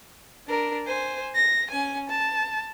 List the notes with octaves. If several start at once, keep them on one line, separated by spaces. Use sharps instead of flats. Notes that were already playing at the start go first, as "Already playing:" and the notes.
D4 A#4
C5 G#5
A#6
C#4 G#5
A5